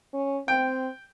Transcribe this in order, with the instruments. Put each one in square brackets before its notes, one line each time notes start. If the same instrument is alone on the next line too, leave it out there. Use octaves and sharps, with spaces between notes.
[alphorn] C#4
[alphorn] C4 [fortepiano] G5